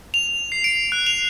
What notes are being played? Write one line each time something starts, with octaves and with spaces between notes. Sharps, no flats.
F7
C7
D7
F#6
F7